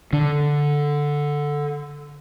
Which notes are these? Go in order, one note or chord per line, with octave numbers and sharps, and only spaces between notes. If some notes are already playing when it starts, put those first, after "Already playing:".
D3 D4